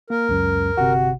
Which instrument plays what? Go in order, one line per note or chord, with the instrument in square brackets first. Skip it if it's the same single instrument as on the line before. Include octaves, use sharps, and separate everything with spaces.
[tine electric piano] A#3 [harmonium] A#4
[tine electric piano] C#2 F#2
[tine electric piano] G1 C3 [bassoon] F#4